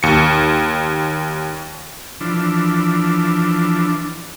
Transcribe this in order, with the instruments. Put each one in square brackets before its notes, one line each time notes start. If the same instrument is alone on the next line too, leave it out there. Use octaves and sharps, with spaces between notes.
[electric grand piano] D#2 C#7
[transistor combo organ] E3 F3 D4